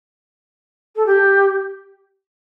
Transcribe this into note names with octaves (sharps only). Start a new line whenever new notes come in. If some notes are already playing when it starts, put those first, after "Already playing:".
A4
G4